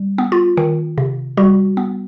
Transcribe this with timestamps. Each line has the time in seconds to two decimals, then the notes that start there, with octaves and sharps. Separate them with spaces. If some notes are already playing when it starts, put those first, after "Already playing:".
Already playing: G3
0.18 B3
0.32 F4
0.57 D#3
0.98 C3
1.37 G3 F#4
1.77 B3